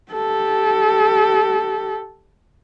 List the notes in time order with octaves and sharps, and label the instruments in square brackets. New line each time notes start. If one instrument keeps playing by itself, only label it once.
[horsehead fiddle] G4 A4